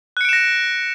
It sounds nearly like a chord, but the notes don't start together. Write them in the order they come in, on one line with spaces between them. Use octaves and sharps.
F#6 C#7 D7 E7 A#6